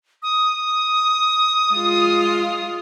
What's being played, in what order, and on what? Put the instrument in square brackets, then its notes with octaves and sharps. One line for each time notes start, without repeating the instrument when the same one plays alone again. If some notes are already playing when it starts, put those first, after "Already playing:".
[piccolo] D#6
[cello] G#3 F4